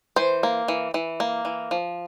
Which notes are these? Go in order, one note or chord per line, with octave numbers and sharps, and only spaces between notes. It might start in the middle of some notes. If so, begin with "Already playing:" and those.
E3 C5
A#3
E3
E3
A#3
E3
F3